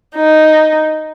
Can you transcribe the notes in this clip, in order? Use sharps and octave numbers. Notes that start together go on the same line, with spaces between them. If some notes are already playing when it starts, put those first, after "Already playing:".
D#4